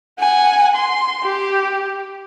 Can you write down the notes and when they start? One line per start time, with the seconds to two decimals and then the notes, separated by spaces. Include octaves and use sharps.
0.20 F#5 G#5
0.76 C6
1.24 G4